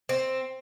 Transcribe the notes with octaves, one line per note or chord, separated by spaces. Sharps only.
C4